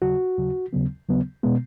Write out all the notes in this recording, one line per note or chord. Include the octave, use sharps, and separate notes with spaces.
D#2 C#3 F#3 F#4
D#2 C#3 F#3
D#2 C#3 F#3 B3
D#2 C#3 F#3 B3
B2 G#3 B3